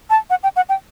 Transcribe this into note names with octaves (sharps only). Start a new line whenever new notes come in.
A5
F#5
G5
F#5
G5